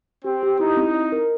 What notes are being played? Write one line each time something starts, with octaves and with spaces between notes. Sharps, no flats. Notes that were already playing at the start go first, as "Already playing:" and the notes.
C4 G4
G4
D#4 E4
C4
D#5
A#4